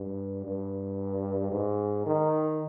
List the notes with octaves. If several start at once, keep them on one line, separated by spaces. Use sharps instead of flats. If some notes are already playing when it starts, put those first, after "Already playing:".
Already playing: G2
G2
G#2
D#3